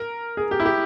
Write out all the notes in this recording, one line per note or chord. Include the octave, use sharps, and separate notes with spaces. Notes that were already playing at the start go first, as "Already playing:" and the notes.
Already playing: A#4
G#4
G4
E4
G4